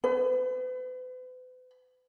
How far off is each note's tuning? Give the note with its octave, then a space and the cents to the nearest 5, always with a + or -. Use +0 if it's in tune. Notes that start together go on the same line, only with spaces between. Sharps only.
B4 +45